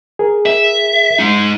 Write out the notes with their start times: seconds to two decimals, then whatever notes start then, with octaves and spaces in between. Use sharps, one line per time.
0.19 G#4 A#4
0.46 E5
1.19 G#3 D#4